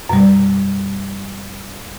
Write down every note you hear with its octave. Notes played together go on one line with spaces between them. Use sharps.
F#2 B2 G3